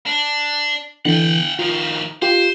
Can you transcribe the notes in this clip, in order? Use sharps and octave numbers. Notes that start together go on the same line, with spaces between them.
D4
D3 E3 B3 F#5 G5
D#3 F3 F4
F4 G4 C5